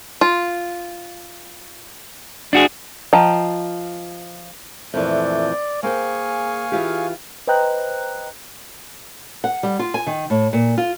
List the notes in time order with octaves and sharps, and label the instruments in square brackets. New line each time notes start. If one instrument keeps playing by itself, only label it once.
[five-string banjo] F4
[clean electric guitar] D4 F#4 G#4
[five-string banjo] F3 D#5 G5 A#5
[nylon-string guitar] F2 A#2 E3 [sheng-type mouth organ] A3 G6 [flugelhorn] D5
[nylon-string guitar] A#3 C5 G5 [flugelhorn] G#4 [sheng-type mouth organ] F5 G#5 C#6
[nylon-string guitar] E3 F4 G4 [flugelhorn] G#4
[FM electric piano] B4 C5 D#5 G5 A#5 F#6
[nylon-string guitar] F#5
G3
F4
G#5
D#3
A2
A#2
F4